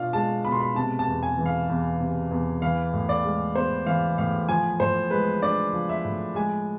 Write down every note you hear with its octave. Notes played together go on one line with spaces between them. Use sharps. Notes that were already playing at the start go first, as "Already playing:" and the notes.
Already playing: B2 D4 F4 F5
G#3 A5
B2 B5
C6
B5
C3 A5
A5
E2
G#5
E3
F5
E2
C3
E2
E3 F5
A2
D5
G#3
B3 C5
E3 F5
A2 F5
F3 G#5
A2 C5
G#3 B4
D4 D5
F3
E5
A2
G#3 G#5